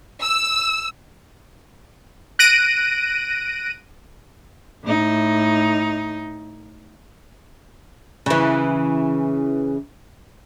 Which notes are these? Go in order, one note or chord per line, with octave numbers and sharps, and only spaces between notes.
E6
F#6 A#6 D7 D#7
A2 D#4
C#3 E3